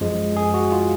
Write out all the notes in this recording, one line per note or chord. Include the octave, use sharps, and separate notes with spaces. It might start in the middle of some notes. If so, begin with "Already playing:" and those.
F#2 F3 G#3
G#4
F#4
F4